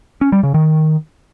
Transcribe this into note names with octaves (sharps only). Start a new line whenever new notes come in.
C#4
G3
C#3
D#3